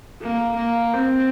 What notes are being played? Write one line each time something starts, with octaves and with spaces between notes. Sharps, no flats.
A#3
A#3
C4